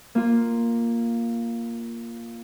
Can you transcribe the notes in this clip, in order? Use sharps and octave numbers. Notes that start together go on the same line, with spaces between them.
A#3 F4